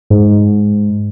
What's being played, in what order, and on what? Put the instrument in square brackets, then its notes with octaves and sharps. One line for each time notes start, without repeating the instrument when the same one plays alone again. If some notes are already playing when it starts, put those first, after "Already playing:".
[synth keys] G#2